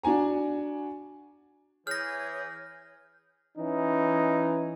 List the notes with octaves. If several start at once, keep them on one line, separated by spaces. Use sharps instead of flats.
D4 F#4 G#5 A#5
E3 G#4 C#5 F6 G6 A#6
E3 C#4 D#4